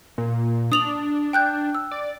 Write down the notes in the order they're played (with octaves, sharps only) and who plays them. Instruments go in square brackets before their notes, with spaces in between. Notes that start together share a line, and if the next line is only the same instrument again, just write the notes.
[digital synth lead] A#2
[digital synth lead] D4 [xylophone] D#6 F7 F#7
[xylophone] G5 F#6 G6
E6
[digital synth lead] D5